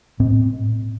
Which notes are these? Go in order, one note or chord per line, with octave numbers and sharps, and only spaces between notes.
A2 C4